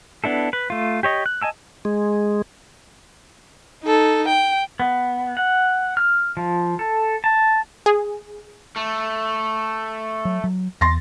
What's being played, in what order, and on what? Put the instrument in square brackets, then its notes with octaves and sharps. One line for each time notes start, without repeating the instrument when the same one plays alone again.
[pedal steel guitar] B3 D4 E4 A4
B4
A3 F4
G4 C#5 D#5
F#6
D#5 G#5 A5 E6
[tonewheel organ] G#3
[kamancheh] D#4 A4
G5
[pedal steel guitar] B3
F#5
F6
F3
A4
A5
[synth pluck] G#4
[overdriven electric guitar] A3
[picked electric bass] F#3
F#3
[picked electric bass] E2 [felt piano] C6 A6 A#6